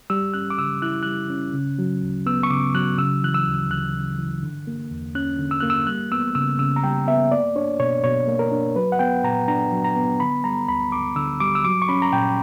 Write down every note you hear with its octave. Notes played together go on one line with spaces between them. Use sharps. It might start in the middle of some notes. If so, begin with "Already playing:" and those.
G3 E6
C#4 F#6
D6
C#3 E6
E4 F#6
G3 F#6
C#4
C#3
F#3
D2
B3 E6
C#6
C#3 D6
F#3 F#6
C#3 E6
E3 F#6
E6
D2
D2 F#6
C#3
E3
D3
A#3
E2
C#4 F#6
D3
E6
A#3 F#6
E6
G3 F#6
B3 E6
C#3 E6
C#3 E6
A#5
G3 G5
B3 E5
A#3 D5
D4 C#5
B2 C#5
B2 C#5
A#3
A#4
D4
F#3 B4
F#5
B3 G5
A#2 A#5
D4 A#5
F#3
A#5
B3
D3 B5
G3 A#5
D2 B5
D2 D6
D3 E6
G3 D6
E6
F#3 D6
C#6
C#4 B5
A#5
A#2 G5